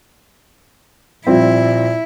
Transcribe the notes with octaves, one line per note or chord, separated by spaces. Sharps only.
A#2 F3 G3 C4 E4